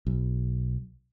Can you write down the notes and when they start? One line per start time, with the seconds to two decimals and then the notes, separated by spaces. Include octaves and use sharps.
0.07 B1